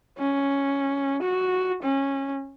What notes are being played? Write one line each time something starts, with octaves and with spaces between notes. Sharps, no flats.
C#4
F#4
C#4